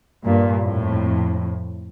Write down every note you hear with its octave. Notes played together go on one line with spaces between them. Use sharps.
G2 A#2
F2 A2